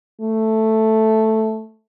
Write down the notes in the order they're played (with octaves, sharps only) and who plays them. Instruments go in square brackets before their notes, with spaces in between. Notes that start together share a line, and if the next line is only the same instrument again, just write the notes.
[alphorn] A3